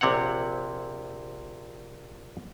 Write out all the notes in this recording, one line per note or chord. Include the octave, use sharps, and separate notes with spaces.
A#1 C3 C4 C#5 F#5